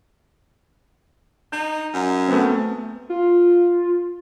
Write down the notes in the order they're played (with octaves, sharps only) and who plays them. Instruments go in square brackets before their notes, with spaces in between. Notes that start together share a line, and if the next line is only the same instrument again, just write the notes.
[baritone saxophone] D#4 [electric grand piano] G6
[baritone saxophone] F#2
[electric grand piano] A3 B3 C4
[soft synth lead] F4